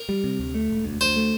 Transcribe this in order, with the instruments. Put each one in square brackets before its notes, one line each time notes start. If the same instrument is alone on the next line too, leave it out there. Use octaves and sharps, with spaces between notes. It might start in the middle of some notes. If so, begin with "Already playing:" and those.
Already playing: [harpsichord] A#4
[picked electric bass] G3
C3
D2
A3
E1
D2
[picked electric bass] D2 [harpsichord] C5
[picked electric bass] A3